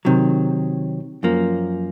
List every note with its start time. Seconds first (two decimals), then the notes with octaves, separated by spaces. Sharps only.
0.05 C3 D#3 F#3
1.23 F#2 F3 A#3